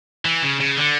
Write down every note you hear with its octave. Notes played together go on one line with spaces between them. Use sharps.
E3
C#3
C#3
D3